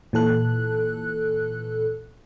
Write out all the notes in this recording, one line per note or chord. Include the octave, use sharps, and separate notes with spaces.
A#2 E3 A4 F#6